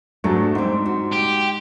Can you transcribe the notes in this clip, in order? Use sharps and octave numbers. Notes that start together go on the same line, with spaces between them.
G#2 F#3 A3 D4
G#2 G3 C4
F#4
G4